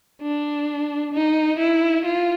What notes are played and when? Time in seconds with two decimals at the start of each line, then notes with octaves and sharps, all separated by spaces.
0.22 D4
1.13 D#4
1.59 E4
2.05 F4